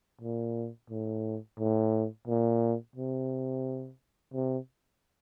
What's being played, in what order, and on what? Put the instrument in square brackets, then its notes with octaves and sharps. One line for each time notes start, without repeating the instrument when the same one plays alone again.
[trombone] A#2
A2
A2
A#2
C3
C3